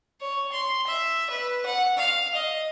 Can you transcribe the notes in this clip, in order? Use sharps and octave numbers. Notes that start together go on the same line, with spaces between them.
C#5
C6
E5
B4
F#5
F5
D#5